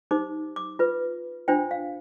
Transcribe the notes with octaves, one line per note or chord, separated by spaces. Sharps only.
D#4 G4 C5 D6
D6
F4 B4
D4 F4 C5 G5
F5